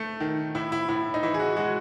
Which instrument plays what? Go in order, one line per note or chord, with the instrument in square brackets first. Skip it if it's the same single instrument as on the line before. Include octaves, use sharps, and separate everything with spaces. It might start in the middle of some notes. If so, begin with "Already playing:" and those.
Already playing: [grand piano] A3
D#3
A2 E4
E4
A2 E4
D#4
E3 E4
G#4
F#4
G#3 F#4